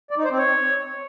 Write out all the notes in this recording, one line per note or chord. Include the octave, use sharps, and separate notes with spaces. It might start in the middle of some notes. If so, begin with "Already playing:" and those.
D5
D#4
C5
C4
C#5